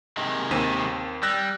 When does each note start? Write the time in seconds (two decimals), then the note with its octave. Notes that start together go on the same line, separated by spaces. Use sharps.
0.17 C3 D#3 G#3
0.51 D#2 C4 D#7
1.23 G3 E6 F#6 A#6